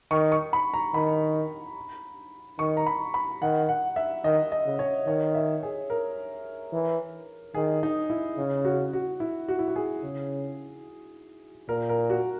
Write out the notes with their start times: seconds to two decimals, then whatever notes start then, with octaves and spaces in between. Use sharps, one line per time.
0.11 D#3 C#6
0.32 C#6
0.53 B5
0.74 A#5
0.94 D#3 B5
2.59 D#3 C#6
2.77 A#5
2.86 B5
3.14 B5
3.42 D#3 F#5
3.69 F#5
3.96 E5
4.24 D#3 D#5
4.52 D#5
4.66 C#3
4.79 C#5
5.07 D#3 C#5
5.35 E5
5.63 G#4
5.90 A#4
6.73 E3
7.55 D#3 G#4
7.83 D#4
8.10 E4
8.37 C#3
8.65 F#4
8.93 F#4
9.20 E4
9.48 F#4
9.59 E4
9.68 F#4
9.76 G#4
10.03 C#3
11.69 A#2 A#4
11.89 A#4
12.10 F#4